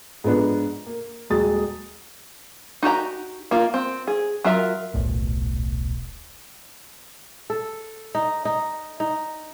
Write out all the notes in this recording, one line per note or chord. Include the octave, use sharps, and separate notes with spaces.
G#2 F3 B3 D4
A#3
D#1 F#3 G#3 D#6 A6
D#4 F#4 G4 A#5
A#3 F4
C4
G#4
F#3 F4 A#4 E5
D#1 B1 A2
A4
D#4
D#4
D#4